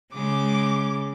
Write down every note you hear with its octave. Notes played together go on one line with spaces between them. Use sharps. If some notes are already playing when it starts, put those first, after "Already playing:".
C#3 G#3 D6